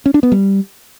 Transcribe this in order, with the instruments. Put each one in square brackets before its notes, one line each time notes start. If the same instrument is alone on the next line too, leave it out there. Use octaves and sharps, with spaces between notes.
[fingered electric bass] C#4
D4
B3
G3